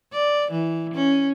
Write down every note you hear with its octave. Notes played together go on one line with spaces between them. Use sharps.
D5
E3
C#4